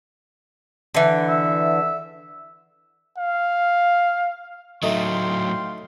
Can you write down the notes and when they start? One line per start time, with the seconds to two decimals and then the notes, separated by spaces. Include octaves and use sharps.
0.94 D3 E3
1.28 E5
3.17 F5
4.83 A2 F#3 A3 D#4 F5 G5 C6